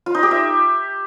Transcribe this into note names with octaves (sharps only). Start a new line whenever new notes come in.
F4
D#4
G4
E5